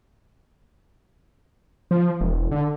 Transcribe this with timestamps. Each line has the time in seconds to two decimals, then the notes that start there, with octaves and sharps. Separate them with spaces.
1.91 F3
2.21 E1
2.51 D3